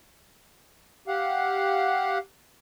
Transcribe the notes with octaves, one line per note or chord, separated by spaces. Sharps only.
G4 F5 F#5